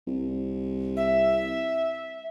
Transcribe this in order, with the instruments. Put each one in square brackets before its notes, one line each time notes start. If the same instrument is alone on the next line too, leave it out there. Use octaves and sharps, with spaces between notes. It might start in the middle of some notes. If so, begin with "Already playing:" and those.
[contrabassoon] C2
[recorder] E5